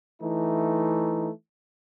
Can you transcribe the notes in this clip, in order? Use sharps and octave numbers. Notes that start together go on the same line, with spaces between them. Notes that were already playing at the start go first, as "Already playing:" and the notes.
E3 A3 D#4